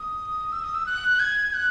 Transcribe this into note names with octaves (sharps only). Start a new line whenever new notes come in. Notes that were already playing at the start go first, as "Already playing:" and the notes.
Already playing: D#6
E6
D#6
E6
F#6
G#6
F#6